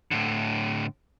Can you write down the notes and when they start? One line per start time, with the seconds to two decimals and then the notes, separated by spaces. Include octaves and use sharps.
0.11 A2 D3